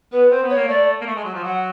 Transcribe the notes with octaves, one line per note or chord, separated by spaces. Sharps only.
B3 B4
C4 C5
B3
C#5
A#3
A3 D5
A#3
A3
G#3
F#3
F3
F#3 F#5